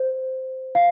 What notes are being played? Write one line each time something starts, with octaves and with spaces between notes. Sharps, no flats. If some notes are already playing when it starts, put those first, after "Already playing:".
Already playing: C5
F5